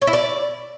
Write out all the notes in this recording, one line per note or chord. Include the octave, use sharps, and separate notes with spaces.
C#5
E4
D5